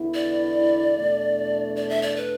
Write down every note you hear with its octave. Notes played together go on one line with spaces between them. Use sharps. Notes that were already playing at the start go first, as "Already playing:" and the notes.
Already playing: E2 D3 B3 E4
D5
E2 B2 A3 D4
D5
E5
D5
B4